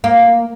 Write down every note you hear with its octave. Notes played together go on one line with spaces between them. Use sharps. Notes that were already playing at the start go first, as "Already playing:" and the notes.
A#3